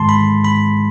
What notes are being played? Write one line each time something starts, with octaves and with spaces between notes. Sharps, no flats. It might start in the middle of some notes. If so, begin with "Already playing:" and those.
Already playing: G#2 D#3 G#3 A5 C6
B5
B5